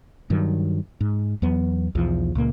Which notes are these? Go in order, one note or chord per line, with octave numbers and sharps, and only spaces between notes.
G2 D#3 F#3
G#2
E2 F#3 B3
B1 E2 F3
C#2 A#2 A#3